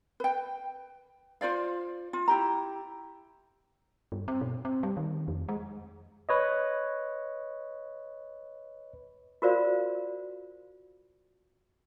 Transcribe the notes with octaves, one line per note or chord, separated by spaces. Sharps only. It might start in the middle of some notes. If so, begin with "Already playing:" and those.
B4 G5
F4 C5 D5 F5
F4
E4 G4 A#5
G2
C4
B2
C4
G3
D#3
F2
G#3
B4 C#5 D#5
F4 F#4 A#4 C5 D5 F5